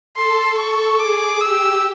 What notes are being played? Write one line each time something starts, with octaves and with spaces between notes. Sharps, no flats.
A4 C6
A4 C#6
G#4 D6
G4 E6